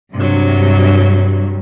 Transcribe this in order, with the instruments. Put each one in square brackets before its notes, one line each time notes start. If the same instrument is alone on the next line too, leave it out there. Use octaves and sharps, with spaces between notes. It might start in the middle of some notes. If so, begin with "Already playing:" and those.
[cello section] G2 [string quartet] C3 F#3